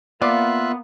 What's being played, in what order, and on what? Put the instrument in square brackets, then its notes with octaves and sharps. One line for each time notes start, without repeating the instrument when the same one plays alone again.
[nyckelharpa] A#3 [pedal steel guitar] B3 [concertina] F4 E5 F#6 [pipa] D5 F5